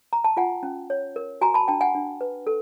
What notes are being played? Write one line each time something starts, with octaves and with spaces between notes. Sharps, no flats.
A#5
A5
F4 F#5 G#5
C#4
C#5
A#4
F#4 G#5 A#5
A5 B5
D4 G5 A5
F#5 G#5
D4
B4
A4